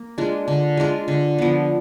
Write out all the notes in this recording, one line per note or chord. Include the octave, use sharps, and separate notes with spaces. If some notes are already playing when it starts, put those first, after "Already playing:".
Already playing: A#3
G#3 D4 F4
D3
G#3 D4 F4
D3
F3 B3